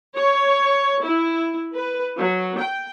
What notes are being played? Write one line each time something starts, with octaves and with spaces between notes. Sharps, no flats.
C#5
E4
B4
F#3
G5